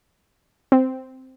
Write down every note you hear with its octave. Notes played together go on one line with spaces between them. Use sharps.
C4